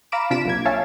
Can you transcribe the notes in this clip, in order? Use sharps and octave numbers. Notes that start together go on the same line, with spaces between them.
F5 A#5 B5 D6 D7 E7
C3 D4 F4 B6 D7 E7
B1 A#3 G#6
C#5 E5 F5 G#5 A5